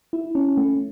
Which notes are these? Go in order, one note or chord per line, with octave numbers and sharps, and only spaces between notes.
E4
C#4
A3